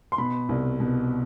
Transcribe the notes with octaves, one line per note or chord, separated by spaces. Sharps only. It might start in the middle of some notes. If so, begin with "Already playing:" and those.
C6
B2 B5
C2
B2